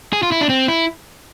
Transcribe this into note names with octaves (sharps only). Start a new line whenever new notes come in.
G#4
F4
E4
D4
C4
E4